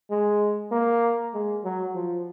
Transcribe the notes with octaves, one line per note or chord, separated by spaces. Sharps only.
G#3
A#3
G#3
F#3
F3